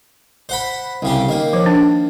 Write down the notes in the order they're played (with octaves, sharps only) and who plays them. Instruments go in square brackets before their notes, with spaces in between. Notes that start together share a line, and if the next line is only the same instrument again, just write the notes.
[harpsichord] C5 F#5 B5
C2 C#3 G4
D#3 A#3
[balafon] F3 C5
D4